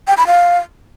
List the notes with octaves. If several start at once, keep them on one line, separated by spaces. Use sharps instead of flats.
G5
B5
F5